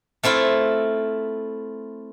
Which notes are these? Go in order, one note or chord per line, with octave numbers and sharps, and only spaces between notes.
A3 C4 E4 F4